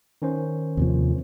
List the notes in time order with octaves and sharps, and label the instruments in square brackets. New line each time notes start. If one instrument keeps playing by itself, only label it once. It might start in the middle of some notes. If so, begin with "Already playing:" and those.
[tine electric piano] D#3 C#4 C5
[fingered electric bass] D#2 C3 F3